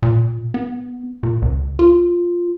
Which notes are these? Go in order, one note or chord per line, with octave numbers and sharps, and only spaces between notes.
A#2
B3
A#2
C#2
F4